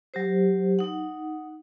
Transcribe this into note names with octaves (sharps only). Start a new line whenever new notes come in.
F#3 G4 C5
D#4 F#5